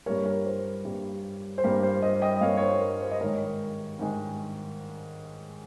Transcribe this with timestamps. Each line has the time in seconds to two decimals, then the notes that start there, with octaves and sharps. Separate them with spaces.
0.06 G2 G3 A#3 A#4 C#5
0.25 A#4 C#5
0.46 C5
0.84 G2 G3 A#3
1.58 C5
1.64 G2 G3 A#3 A#4
1.83 C5
2.02 C5 D#5
2.22 D#5 G5
2.36 D#5
2.41 G2 G3 A#3 C#5 F5
2.57 C#5
2.62 C5
2.81 A#4
3.01 C5
3.11 D#5
3.20 G#2 D#3 G#3 A#4 C#5
3.99 G#2 D#3 G#3